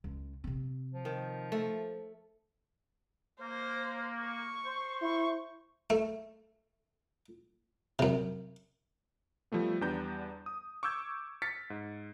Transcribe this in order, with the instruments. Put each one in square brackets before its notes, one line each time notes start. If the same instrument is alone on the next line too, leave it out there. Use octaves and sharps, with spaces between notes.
[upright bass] C#2
C3 C4
[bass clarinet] F3
[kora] D#3
A3
[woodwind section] A#3 [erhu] C5
[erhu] C#6
[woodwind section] C5
[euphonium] E4 [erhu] C#6
[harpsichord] A3
F#2 C3
[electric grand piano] F3 G3 A3 B3
E2 G3 B3 D4 A#5 G6
D#6
C#6 D6 E6 G6 G#6
F6 A6 B6 C#7
G#2